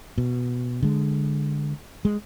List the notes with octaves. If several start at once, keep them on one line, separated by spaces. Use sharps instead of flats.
B2
D3 G#3
G#3